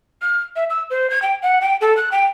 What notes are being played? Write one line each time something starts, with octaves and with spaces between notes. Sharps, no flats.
F6
E5
E6
C5
G#6
G5
F#5
G5
A4
F#6
G5